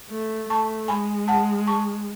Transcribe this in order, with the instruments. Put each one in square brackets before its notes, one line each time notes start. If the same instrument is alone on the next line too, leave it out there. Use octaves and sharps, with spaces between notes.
[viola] A3
[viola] A3 [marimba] A5 C#6
[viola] G#3 [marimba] G#5 B5
[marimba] F#5 A5
A5 C#6